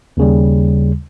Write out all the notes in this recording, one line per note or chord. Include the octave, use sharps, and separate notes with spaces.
D#2 C#3 G3